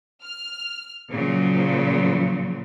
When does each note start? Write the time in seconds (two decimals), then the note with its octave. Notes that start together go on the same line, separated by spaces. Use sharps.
0.22 F6
1.11 A#2 C#3 F3 F#3